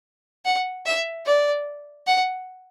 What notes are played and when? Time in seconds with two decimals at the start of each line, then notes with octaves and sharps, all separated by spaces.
0.45 F#5
0.85 E5
1.25 D5
2.06 F#5